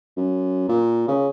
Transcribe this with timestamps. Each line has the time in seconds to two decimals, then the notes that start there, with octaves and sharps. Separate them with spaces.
0.17 F#2
0.69 A#2
1.08 C#3